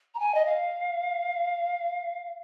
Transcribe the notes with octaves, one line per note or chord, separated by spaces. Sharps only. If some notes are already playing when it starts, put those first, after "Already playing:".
A#5
G#5
D#5
F5